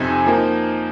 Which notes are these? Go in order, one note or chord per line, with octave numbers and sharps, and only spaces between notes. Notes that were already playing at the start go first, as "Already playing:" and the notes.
Already playing: F2 C3 F3 C4 D#4 G#5
F3 A#3 D#4